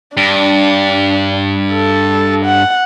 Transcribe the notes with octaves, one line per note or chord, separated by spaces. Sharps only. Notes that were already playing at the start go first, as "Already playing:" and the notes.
G2 D4
A4
F#5